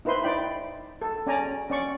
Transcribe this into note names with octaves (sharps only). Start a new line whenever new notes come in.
D#4 E4 B4 C5 C6
D#4 D5 G5 B5
A4
C#4 D5 G#5 A#5
C#4 D5 C#6